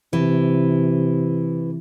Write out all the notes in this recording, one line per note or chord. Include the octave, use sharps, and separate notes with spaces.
C3 E3